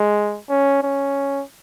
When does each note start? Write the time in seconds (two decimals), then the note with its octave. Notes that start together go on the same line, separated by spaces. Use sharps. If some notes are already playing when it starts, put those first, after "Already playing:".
Already playing: G#3
0.50 C#4
0.83 C#4